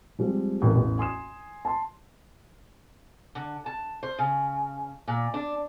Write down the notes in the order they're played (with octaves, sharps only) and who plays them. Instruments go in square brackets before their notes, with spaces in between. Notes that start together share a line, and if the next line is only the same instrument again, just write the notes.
[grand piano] F3 G3 G#3 C4
A1 A#4
A1 E2
G#5 C6 D#6 E7
A5 C6
[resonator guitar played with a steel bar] D3
A5
C5
C#3
A#2
D4